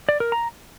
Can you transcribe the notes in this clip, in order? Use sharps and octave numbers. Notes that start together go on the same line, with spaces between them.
D5
A#4
A#5